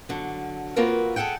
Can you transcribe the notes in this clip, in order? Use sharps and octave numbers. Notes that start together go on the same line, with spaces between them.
D3 F#3
A#3 C4 F4 F#4 A#4 B4
G#4 A4 E5 F#5 G5